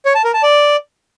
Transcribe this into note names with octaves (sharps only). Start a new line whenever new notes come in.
C#5
A5
A#4
A5
D5